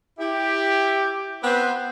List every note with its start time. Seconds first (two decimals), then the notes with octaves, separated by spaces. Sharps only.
0.19 E4 G4
1.43 B3 C4 B4 C5